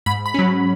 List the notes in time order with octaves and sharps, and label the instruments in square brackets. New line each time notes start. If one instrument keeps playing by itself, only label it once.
[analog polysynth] G#2 B5
B5
F#3 C#4